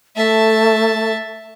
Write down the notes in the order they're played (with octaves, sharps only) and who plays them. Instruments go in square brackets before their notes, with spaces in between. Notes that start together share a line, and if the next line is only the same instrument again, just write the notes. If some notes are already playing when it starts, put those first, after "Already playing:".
[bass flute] A3 [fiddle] E5 A5